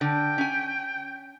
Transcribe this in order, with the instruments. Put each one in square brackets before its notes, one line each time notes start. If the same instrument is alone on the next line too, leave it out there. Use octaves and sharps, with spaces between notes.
[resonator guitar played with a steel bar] D3 [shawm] G5
[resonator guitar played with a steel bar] C#4 G#5